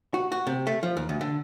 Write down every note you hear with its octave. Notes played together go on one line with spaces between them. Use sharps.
F#4
F#4
C3
A3
F3
D#2
D2
D3